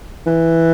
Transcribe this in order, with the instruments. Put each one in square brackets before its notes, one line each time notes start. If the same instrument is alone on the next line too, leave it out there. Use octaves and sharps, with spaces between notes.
[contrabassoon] E3